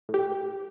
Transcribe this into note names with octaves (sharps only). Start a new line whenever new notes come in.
A2
G4